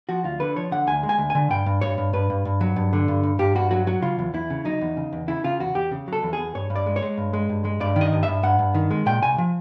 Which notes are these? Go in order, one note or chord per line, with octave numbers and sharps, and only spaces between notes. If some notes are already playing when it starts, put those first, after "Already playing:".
F3 F#4
D2 F4
D3 B4
F3 C#5
D3 F#5
D2 G#5
G#3
G#5
D2
D3 G#5
G2 G5
G2
G2 C#5
G2
G2 B4
G2
G2
F#3
G2
D3
G2
G2
G2 G4
G2 F#4
F#3 F#4
F#3 F#4
C#3 F4
E2
E2 E4
C#3
F#3 D#4
E2
C#3
E2
C#3 E4
C#3 F4
E2 F#4
E2 G4
C#3
F#3 A4
E2
G#4
E2
G2 C#5
G2
D5
G#3
C#5
G#3
G2
G#3
G2
G#3
G2 D5
D#3
D#5
G2
E5
G2
G2 F#5
G2
D#3
G#3
A#2 G5
C2 G#5
F3